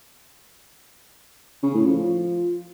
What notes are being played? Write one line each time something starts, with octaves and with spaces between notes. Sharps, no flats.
C#3
A2
F3